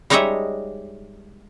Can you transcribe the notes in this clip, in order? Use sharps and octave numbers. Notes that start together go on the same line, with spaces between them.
G3 G#3 D#4 C#5 D#5 E5